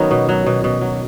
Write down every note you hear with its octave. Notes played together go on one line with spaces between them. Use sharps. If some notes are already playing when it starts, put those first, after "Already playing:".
Already playing: D#3 F#3 B3 C#4 D#4
B2
F#3
B2
B2
F#3